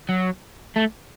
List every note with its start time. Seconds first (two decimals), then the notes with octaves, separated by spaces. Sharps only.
0.09 F#3
0.76 A3